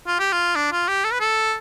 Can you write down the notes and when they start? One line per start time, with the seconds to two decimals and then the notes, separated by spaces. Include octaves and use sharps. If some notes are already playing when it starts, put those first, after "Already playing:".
0.07 F4
0.20 G4
0.33 F4
0.56 D4
0.72 F4
0.88 G4
1.05 A4
1.13 B4
1.20 A4